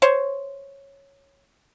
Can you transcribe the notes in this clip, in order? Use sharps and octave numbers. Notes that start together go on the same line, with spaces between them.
C5 C#5